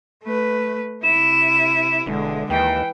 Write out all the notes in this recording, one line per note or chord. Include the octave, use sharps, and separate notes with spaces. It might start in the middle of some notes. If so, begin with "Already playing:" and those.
A3 B4
C3 E4 E7
E1 D3 G#3
D#2 E3 G5